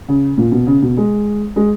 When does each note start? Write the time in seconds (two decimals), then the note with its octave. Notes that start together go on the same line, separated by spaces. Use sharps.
0.08 C#3
0.38 A#2
0.52 B2
0.67 C#3
0.82 B2
0.97 G#3
1.56 G#3